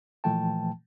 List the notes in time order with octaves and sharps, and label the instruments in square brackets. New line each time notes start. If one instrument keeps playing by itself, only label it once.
[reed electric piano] A#2 E3 F3 A3 G5 A5